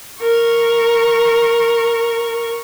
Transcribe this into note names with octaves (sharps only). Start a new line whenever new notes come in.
A#4 C#6